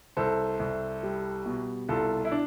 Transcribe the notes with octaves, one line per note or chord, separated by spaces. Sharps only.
C2 A4 C5
C2
G3
B2
C2 F4 A4
E4
D4